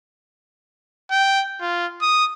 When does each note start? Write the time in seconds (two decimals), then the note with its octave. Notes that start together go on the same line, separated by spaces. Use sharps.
1.11 G5
1.61 F4
2.02 D#6